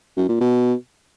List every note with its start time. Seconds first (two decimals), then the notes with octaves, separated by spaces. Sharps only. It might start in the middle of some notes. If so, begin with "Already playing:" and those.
0.17 F#2
0.29 A#2
0.41 B2